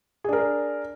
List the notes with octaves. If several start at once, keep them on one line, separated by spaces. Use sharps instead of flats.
D4 G#4 A#4